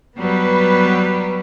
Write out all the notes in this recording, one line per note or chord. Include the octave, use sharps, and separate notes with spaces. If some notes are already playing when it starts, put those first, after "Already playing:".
F#3 G3 B3 B4